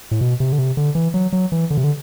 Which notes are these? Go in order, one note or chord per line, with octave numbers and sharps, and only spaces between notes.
A2
B2
C3
D3
C3
D3
E3
F#3
F#3
E3
D3
C3
D3